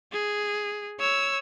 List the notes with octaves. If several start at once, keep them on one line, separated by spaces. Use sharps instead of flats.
G#4
C#5 E6